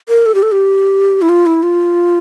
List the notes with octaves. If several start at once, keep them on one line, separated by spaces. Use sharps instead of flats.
A#4
A4
G4
A4
G4
E4
F4
E4
F4